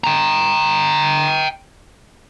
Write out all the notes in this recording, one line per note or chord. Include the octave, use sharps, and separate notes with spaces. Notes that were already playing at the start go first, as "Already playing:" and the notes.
G5 A#5